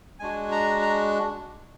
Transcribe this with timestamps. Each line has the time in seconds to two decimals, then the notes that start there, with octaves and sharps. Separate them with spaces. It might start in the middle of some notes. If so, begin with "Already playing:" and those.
0.19 G#3 D4 F#4 G#5
0.51 A#5
0.81 A#5